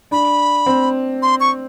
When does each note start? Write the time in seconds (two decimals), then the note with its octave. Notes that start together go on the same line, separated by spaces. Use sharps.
0.11 D4 B5
0.66 C4
1.22 C6
1.40 C#6